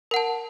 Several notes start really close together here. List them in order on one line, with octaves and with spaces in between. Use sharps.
A#4 F#5 A5